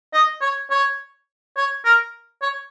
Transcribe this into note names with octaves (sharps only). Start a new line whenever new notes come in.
D#5
C#5
C#5
C#5
A#4
C#5